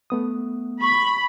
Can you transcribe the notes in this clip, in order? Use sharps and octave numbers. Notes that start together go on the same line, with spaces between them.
A3 B3 D#6
B5 C#6